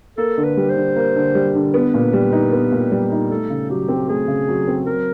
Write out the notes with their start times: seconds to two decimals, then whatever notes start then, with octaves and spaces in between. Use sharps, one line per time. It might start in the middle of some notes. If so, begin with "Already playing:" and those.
0.18 A#3 A4
0.38 D3
0.44 B4
0.57 G3
0.70 C5
0.76 D3
0.96 A#3
1.16 D3
1.35 G3
1.55 D3
1.73 B3 B4
1.94 A#2
2.13 G3
2.32 D#4
2.52 B3
2.72 A#2
2.91 G3
3.11 D#4
3.31 A3 A4
3.50 C#3
3.70 F#3 G4
3.88 C4
4.08 A3 G#4
4.28 C#3
4.48 F#3
4.67 C4
4.86 F#3 A#4